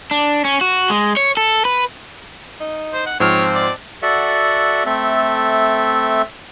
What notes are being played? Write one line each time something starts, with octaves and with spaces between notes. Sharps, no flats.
D4
C#4
F#4
G#3
C#5
A4
B4
D#4
C5
F#5
G#2 F3 C4 C#5 F6
D5
F#4 A4 D5 E5 F#5
A3 C4 A4 E5